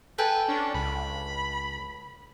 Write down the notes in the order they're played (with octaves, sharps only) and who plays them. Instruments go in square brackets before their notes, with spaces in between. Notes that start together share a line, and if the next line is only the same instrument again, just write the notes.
[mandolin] A4 G5 G#5 [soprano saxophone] B4
[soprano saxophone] C#4 [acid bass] D4
[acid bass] C#2 [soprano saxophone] B5